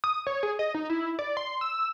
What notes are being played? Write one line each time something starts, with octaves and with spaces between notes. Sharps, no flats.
D#6
C#5
G#4
D#5
D#4
E4
D5
C6
E6